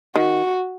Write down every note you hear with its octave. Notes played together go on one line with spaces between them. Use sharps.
D#3 F#4